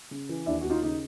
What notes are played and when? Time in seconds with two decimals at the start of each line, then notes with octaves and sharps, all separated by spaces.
0.11 C#3
0.29 E3
0.46 D#2 D4 E4
0.61 D#2 F#4
0.70 D#4 F4
0.82 C#3 D#4